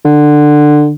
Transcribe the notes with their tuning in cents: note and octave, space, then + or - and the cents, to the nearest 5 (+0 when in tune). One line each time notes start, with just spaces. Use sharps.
D3 +15